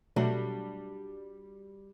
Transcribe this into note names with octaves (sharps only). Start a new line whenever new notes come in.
B2 F#3 G3 A3 D4 F#4